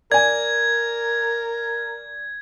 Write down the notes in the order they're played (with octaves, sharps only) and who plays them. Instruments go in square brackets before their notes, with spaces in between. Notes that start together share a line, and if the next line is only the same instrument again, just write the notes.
[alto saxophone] A#4 [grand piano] D5 G#5 [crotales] G#6